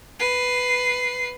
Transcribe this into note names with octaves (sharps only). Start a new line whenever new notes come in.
B4 C7